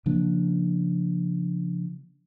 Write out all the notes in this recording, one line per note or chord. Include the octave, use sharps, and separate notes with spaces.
C#3 F3 A#3 D4